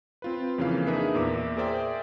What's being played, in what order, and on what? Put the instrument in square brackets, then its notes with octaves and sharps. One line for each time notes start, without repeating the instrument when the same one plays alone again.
[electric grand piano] C4 F4 B4
F2 C#3 E3 A#3 B4 F5
D4 D#4 G#4 A#4 B4 E5
E2 A#2 A#4 E5 D6
G#4 A#4 C5 D5 E5 G5